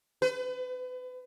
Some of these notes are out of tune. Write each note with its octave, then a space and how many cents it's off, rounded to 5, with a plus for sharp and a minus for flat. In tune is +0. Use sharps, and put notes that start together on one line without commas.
B4 +35